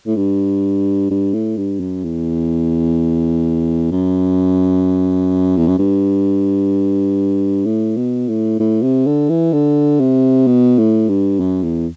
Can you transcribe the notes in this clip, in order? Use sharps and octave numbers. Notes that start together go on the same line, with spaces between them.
A2
G2
G2
A2
G2
F#2
E2
F#2
E2
F#2
G2
A2
B2
A2
A2
C3
D3
E3
D3
C3
B2
A2
G2
F#2
E2